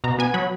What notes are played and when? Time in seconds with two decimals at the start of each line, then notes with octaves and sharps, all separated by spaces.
0.04 B2 A#5
0.19 B3 G#5
0.34 F#3 B5